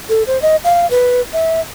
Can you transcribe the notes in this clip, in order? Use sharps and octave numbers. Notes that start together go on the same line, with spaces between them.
A4
C5
D#5
F5
B4
E5